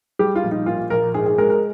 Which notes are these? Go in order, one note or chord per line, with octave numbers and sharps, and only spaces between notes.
G3 G4
F4
A#1
D#4
A#2 F4
A#1 A#4
G#2 G#4
G#4
G#3 A#4
A#4